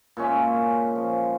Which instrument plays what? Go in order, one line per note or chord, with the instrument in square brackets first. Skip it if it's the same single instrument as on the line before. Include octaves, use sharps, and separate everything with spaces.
[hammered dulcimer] A#2 G#3 C#4 E5
F3